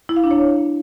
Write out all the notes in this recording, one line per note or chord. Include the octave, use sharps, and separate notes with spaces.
E4
F5
D4
C#5